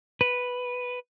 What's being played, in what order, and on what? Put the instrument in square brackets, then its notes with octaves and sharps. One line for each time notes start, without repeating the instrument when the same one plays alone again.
[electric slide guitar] B4